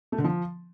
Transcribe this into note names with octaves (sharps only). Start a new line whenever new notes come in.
A3
D3
F3